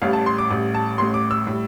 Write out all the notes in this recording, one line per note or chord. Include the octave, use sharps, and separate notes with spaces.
A1 A2 G3 F5
A5
C6
D6
A1 A2 G3
A5
A1 A2 G3 C6
D6
E6
A2 G3